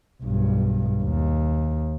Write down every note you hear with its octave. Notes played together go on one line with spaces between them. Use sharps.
B1 G2
D#2